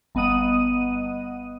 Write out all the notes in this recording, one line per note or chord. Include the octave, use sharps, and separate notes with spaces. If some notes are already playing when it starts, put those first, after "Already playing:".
G1 B3 D#5 F#5 D#6 D#7